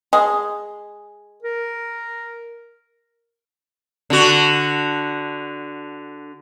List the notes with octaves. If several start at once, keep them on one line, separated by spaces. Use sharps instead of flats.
G#3
A#4
D3 F#4